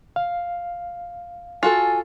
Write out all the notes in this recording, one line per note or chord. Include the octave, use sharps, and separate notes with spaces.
F5
F4 F#4 A4 G#5